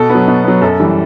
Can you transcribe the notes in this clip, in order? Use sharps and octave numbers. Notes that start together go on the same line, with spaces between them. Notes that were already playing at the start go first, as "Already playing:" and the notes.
Already playing: B2 A4
B3
F#3
B2
F#3 B3
F#2 A4
E3 G3